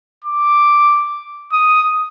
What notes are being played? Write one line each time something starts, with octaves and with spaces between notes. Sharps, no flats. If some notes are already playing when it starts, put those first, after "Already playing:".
D6
D#6